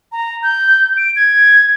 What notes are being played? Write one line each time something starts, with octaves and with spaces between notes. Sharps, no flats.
A#5
G6
D7
G#6